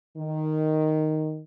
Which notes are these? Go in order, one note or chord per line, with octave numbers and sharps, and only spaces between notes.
D#3